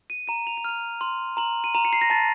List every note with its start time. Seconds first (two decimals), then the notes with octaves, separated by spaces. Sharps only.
0.10 D#7
0.28 A#5 D#7
0.47 F7
0.57 D#7
0.64 F6 F7
1.01 C6
1.37 A#5 F#7
1.64 D#7
1.75 A#5 F7
1.85 C#7
1.93 C7
2.01 A#6
2.10 A5 A6